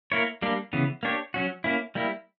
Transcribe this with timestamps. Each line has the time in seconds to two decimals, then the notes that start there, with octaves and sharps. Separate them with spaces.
0.12 A#3 E4 A#4 C#5
0.42 G3 A#3 D4
0.73 C#3 E3 B3
1.03 A#3 D4 G4 C#5
1.34 F#3 C#4 F#4
1.64 A#3 C#4 E4
1.95 G3 A#3 E4